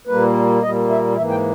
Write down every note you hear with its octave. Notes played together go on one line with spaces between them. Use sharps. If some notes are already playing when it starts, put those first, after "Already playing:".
A#2 G3 A#3 B4
A#2 G3 A#3 D#5
E5
G#2 E3 A#3 E5
G5